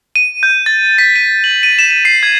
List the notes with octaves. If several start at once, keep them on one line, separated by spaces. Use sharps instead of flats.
D#7
G6
A6
B6
D#7
F#7
D#7
E7
E7
C7
G#6